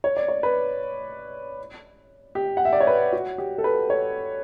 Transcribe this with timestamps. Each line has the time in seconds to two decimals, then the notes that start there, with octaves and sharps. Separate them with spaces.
0.04 C#5
0.17 D5
0.28 C#5
0.43 B4
2.35 G4
2.57 F#5
2.65 E5
2.73 D5
2.80 C#5
2.87 B4
3.13 F#4
3.38 G4
3.58 A4
3.64 B4
3.90 C#5